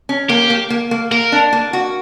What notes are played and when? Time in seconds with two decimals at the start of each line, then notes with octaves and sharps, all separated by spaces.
0.09 C#4
0.30 A#3 G4
0.50 A#3
0.70 A#3
0.91 A#3
1.11 A#3 A#4
1.32 D4
1.53 A#3
1.73 F#4